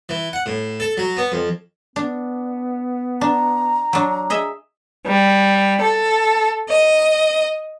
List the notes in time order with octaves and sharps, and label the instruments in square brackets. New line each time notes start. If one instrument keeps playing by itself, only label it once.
[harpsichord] E3
F#5
A2
A4
F#3
B3
F2
[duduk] B3 [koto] D4
[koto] D4 [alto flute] A#5
[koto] F#3 D4
G#4 D#5 E5
[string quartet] G3
A4
D#5